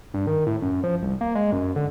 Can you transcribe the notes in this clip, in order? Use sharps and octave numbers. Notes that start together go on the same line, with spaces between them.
G2
D#3
A2
F#2
F3
C2
A#3
G#3
F#2
D3